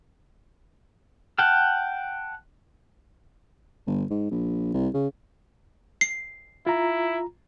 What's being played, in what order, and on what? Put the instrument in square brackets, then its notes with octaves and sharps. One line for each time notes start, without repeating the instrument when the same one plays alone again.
[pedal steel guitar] F#5 G5 A5 F6
[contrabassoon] G1
G#2
A#1
C2
C#3
[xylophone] C7
[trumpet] E4 [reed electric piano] F4 A#5